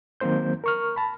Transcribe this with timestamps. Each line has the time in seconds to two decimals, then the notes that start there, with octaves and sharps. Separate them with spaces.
0.20 D#3 F#3 A#3 C4 C5 G6
0.64 A#4 C#6 F6
0.96 A5 B5